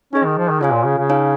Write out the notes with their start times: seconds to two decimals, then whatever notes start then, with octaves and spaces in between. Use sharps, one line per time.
0.13 C#4 D#4 G#4 D#5
0.24 D#3
0.38 F3
0.49 D#3
0.61 C#3 F4 C#5 F5 G#5
0.73 A#2
0.85 C#3
0.98 C#3
1.10 D#4 C#5 F5 G#5